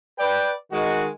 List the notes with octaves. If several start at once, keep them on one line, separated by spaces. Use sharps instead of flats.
B4 D5 G5
D#3 G#3 F#4